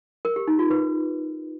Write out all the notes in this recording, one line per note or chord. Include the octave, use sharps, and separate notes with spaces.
A#4
G4
D#4
F4
B4